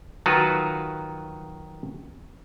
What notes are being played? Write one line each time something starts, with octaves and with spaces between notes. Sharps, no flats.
D#3 F#3 F4 F#4 B4